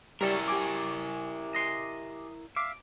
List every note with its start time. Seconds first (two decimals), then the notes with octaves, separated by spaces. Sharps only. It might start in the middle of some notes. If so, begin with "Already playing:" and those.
0.21 F#3 G3 C#4 E4 G4 A4 A#4 D5
0.48 G4 G#5 D6
1.55 D#5 C6
2.56 E5 F5 D6